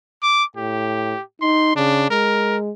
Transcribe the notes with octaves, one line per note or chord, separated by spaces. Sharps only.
D6
A2 G4
D#4 C6
C#3 D4
G#3 A#4